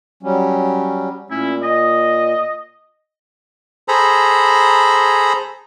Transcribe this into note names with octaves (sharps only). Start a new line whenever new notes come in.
F#3 G3 C#4
A#2 A3 C#4 E4
D#5
G#4 A4 C5 A#5 B5